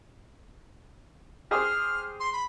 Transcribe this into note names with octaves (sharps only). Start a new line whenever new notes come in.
G4 G#4 C5 F6
C6
B5